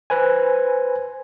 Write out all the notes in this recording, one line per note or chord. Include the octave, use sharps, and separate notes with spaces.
B4 C5 G#5